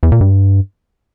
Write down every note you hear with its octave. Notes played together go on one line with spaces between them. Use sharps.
E2
A#2
G2